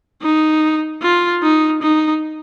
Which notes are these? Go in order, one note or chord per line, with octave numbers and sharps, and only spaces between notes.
D#4
F4
D#4
D#4